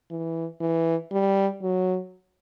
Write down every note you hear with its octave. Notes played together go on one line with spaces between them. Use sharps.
E3
E3
G3
F#3